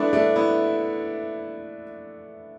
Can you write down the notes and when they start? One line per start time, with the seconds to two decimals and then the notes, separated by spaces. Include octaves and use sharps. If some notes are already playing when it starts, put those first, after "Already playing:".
Already playing: A3 B3 D4 E4
0.13 A3 D4
0.36 B3 E4